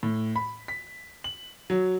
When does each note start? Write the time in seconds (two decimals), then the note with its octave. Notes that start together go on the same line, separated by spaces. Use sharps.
0.03 A2
0.36 B5
0.68 B6
1.24 F#7
1.70 F#3